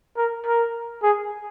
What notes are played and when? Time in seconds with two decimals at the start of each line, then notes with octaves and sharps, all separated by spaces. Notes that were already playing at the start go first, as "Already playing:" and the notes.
0.17 A#4
0.46 A#4
1.03 G#4